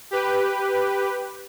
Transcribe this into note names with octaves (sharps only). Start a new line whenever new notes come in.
G4 B4